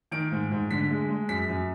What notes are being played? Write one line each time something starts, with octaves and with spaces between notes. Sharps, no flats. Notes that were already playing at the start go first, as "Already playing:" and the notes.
D#3 D7
G#2
G#2
D3 B6
G#3
G#3
F#2 B6
F#2